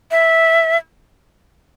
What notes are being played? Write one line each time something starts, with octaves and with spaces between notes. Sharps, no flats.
E5